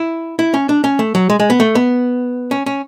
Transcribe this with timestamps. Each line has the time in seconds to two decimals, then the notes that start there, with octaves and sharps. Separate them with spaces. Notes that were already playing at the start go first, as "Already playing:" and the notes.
Already playing: E4
0.39 E4
0.54 C#4
0.69 D4
0.84 C#4
0.99 A3
1.15 F#3
1.30 G#3
1.40 G#3
1.50 B3
1.60 A3
1.75 B3
2.51 C#4
2.66 C#4